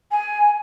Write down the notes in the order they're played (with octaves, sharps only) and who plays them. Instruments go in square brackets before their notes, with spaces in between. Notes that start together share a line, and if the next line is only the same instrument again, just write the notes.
[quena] G#5